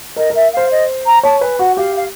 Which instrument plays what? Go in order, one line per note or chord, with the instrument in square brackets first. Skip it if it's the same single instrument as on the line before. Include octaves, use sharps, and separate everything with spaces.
[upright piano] A#4 [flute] D#5
[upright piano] A#4 [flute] E5
[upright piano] C5 [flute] F5
[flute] D#5
A#5
[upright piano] C#5 [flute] A5
[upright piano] B4 [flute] G#5
[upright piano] F#4 [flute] F#5
[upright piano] G4 [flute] F5
[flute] F5